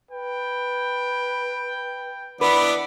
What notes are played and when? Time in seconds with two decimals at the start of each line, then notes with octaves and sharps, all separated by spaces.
0.11 B4 G5
2.41 E3 B3 D4 B4 D6